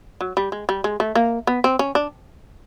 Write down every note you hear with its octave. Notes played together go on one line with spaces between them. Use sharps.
F#3
G3
G#3
G3
G#3
A3
A#3
B3
C4
C#4
D4